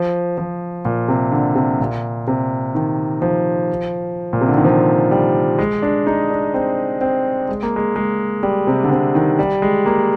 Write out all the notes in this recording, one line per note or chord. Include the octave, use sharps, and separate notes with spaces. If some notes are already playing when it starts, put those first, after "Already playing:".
Already playing: F3
F3
A#2
C3
D3
C3
A#2
C3
D#3
F3
A#2
C3
D3
D#3
F3
G3
G#3
D4
D#4
D4
C4
C4
G#3
A#3
G#3
G#3
G3
C3
D3
C3
D#3
G3
G#3
A#3